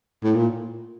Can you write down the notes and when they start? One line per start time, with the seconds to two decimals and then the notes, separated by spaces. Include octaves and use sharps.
0.23 A2
0.35 A#2